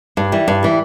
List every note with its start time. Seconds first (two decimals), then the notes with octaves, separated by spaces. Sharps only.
0.17 G2
0.32 E3 G3
0.48 G2
0.63 E3 G3